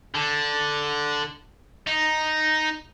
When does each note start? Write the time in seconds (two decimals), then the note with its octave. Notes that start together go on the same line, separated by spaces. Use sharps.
0.15 D3
1.87 D#4